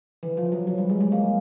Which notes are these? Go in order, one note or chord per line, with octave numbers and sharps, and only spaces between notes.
E3
F3
F#3
F#3
G3
G#3
G#3
A#3